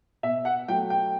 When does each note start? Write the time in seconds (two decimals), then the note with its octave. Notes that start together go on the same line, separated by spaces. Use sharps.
0.23 B2 E5
0.45 F#5
0.68 F#3 A3 G5
0.90 G5